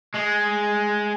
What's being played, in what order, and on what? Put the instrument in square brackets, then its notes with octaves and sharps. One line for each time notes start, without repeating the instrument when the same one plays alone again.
[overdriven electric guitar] G#3